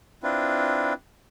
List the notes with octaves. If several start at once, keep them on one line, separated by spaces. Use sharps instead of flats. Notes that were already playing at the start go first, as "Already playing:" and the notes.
C4 D4 E4 F4 B4